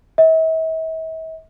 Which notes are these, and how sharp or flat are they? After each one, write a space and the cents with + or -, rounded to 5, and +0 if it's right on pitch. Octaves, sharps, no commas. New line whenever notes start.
E5 -45